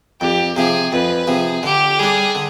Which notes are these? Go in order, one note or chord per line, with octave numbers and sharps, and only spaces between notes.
F2 G4
C3 F3 G#4
F2 B4
C3 F3 G#4
D3 G4
G3 D4 G#4
D3